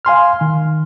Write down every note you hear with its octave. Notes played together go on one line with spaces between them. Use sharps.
F5 G#5 C6 F6
D#3